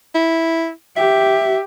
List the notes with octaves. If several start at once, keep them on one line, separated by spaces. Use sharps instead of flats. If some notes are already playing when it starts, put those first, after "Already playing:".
E4
G4 E5